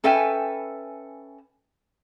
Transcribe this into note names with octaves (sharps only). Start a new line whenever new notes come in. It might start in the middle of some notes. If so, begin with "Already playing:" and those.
C#4 A4 B4 E5 G5 G#5